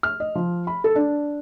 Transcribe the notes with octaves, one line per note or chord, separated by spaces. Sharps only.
F6
D#5
F3
B5
A4
D4